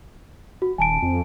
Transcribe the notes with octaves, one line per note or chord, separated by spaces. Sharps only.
F#4
D#1 G#5 A5 D7
F2